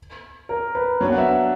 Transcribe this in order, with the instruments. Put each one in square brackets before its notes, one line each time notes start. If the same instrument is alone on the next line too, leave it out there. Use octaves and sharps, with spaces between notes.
[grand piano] A#4
B4
[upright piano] F#3 B3 D4 [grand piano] C#5
[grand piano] F#5
E5